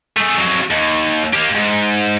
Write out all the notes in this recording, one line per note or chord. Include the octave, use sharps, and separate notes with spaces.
A3 G#4
F2 F#3
D#2
A#3 G4
G#2